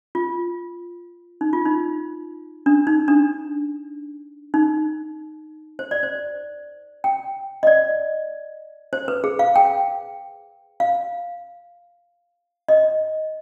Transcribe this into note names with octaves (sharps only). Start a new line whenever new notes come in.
F4
D#4
F4
D#4
D4
D#4
D4
D#4
C5
D5
C5
G5
D#5
D5
C5
B4
G#4
F5
G5
F5
D#5